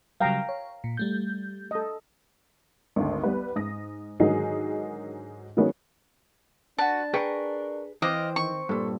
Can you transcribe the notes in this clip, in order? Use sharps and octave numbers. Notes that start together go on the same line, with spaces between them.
C#3 F#3 G3 F5 G5 A#5
C#5
A#2
G3 A3 G6
A4 D#5
G#1 D2
G3 B3 B4
G#2 D#6 A#6
G#2 D3 D#3 F#3 D#4 G#4
D#3 F#3 G#3 B3 C#4
D4 F#4 B4 A5
G#4 A#4 B4 G5 C#6
E3 C4 C5 D#5 F5 D6
D#3 C#6
G2 A#2 A4